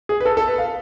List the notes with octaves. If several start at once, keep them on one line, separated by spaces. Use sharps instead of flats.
G#4
B4
A4
A4
B4
F5